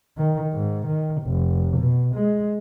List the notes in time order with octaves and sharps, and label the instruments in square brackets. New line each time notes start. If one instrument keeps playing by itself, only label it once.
[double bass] D#3
G#2
D#3
F1
B2
G#3